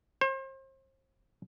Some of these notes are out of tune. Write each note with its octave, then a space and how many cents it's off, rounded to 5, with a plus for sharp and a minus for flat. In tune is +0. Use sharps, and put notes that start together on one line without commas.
C5 +35